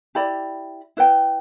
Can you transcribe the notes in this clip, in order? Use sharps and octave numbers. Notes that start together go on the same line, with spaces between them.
E4 G4 D5 B5
E4 B4 G5